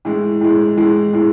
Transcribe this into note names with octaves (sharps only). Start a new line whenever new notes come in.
A2 E3 G#3
A2 E3 G#3
A2 E3 G#3
A2 E3 G#3